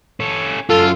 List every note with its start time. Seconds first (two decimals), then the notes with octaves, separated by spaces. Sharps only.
0.20 C#4 A4
0.70 F#2 F4 A4 F5